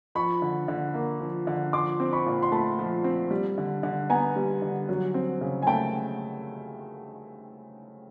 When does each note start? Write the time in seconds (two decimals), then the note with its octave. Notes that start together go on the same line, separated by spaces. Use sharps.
0.15 F3 B5 C#6
0.42 D3
0.68 D3
0.94 A#3
1.21 F3
1.47 D3
1.73 F3 C6 D6
2.00 C4
2.13 B5 C#6
2.26 A#2
2.43 C6
2.52 A3 A5 B5
2.79 F3
3.04 C4
3.31 G3
3.58 D3
3.83 D3
4.10 B3 G#5 A#5
4.36 G3
4.62 D3
4.89 F#3
5.14 C4
5.41 C#3
5.62 G#5
5.67 A3 G5 A5